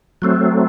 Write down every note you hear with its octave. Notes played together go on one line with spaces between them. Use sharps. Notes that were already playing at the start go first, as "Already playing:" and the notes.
F#3 A3 C4